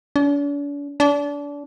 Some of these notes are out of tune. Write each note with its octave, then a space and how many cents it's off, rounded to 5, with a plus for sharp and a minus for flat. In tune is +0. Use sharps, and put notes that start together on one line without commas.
D4 -45
D4 -30